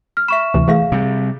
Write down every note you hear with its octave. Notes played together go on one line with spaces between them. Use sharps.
F6
E5 B5 C#6 B6 E7
D2 C3 E3
E3 A3 G#4 F5 A#6
C3 G3